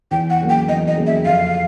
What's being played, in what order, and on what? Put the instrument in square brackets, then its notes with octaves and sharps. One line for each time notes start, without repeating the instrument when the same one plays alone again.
[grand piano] E2 [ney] G5
[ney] F#5
[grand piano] C#3 F#3 A#3
[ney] G5
[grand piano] E2 [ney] D#5
[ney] D#5
[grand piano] C#3 F#3 A#3
[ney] E5
[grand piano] F2 [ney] F5